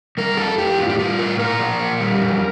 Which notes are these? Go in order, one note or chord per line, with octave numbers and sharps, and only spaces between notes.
G3 A#4
F2 A4
F2 G4
A2 F4
G4
G3 F4
A2 A#4
A#2 A#4
F3
A#2
G3
F2